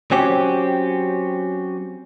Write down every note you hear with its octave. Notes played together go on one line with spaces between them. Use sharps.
F#3 C4 C#4 G4